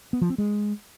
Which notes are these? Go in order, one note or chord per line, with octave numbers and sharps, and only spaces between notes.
B3
F3
C4
G#3